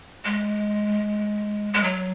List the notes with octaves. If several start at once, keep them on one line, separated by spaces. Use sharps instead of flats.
G#3
G#3
F#3